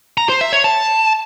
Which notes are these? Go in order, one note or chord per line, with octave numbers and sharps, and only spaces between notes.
A#5
C5
E5
C#5
A5